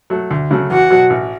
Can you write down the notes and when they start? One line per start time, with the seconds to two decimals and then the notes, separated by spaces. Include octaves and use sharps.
0.10 F#3 A3
0.31 D2
0.51 C#3 F#3 A3
0.70 E2 F#4
0.90 B2 F#3
1.10 A1